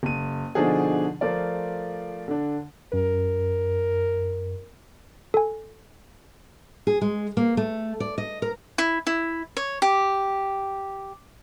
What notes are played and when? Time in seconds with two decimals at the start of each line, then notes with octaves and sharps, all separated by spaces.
0.03 F#1 D#7
0.55 B2 D3 F3 D4 D#4 G#4
1.21 F3 A3 F4 A#4 D5
2.28 D3 D4
2.93 F#2 A#4
5.34 A4 G#5
6.87 G#4
7.01 G#3
7.37 A#3
7.57 A3
8.00 D5
8.18 D#5
8.42 A#4
8.78 E4
9.07 E4
9.57 C#5
9.82 G4